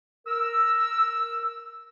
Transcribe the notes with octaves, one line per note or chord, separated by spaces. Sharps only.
A#4 E6